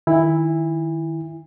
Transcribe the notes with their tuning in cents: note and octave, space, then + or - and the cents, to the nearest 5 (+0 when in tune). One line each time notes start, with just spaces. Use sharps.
D#3 +0 E4 +0 G#5 -35